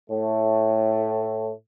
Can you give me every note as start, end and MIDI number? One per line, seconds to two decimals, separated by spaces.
0.10 1.51 45
0.10 1.51 57